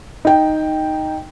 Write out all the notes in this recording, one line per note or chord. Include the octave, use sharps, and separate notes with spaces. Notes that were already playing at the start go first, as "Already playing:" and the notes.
D#4 G5